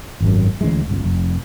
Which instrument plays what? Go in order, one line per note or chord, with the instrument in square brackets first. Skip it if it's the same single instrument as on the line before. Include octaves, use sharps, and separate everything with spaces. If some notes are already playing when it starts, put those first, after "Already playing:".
[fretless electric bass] G#1 F#2
D2 C#3 E3 G#3
G1 C#2
F1